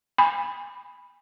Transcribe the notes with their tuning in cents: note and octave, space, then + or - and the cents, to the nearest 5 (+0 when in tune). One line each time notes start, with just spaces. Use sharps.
G#5 -35 B5 +0